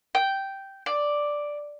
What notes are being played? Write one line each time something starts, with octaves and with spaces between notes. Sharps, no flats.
G5
D5